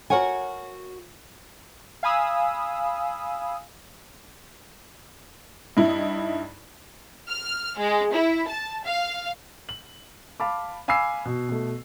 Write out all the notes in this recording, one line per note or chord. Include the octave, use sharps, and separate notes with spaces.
F#4 A#4 C#5 F#5 G#5
F5 G#5 B5 D#6 E6
G2 D#4 E4
F6
G#3
E4
A5
F5
F#7
F5 A5 B5 D6
F5 G#5 B5 D6 E6 C7
B2
B2 A3